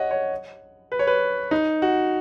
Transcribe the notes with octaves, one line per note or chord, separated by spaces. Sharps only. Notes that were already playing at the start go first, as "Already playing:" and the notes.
Already playing: C#5 D#5 F#5
C#5
B4
C#5
B4
D#4
F#4